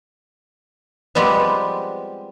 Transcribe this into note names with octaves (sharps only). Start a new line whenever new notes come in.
F3 G3 G#3 B3 C4 G4